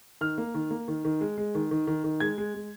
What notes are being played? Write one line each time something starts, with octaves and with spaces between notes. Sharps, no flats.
D#3 F6
A#3
D#3
A#3
D#3
D#3
G#3
G#3
D#3
D#3
D#3
D#3
G#3 G#6
G#3
G#3